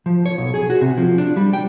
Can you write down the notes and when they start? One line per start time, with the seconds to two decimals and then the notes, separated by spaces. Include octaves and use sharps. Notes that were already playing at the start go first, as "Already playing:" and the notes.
0.06 F3
0.26 C#5
0.38 B1
0.54 G#4
0.70 F#4
0.81 C3
0.98 F3
1.18 D4
1.36 G3
1.53 G5